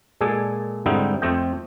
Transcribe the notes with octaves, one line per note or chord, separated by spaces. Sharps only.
A#2 G#3 G#4 A4 D5
G#2 D3 G3 C4 D#4 E4
F2 A3 C4 D#5 G5